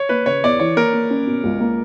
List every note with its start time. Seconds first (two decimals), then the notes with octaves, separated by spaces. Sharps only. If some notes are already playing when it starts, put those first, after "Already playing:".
Already playing: C#5
0.09 A#3 B4
0.26 C#3 C#5
0.44 E2 D5
0.59 E3 C#5
0.76 A#3 A#4
0.93 A#3
1.10 C#4
1.27 B2
1.44 C#2
1.60 A#3